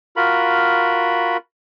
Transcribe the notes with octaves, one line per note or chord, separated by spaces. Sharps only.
F4 F#4 A#4 B5